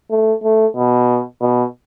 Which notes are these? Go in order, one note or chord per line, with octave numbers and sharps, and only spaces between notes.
A3
A3
B2
B2